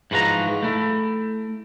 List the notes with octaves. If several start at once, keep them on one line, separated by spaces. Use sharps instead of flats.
G#2 E3 F3 F#4 A#5
A3 E4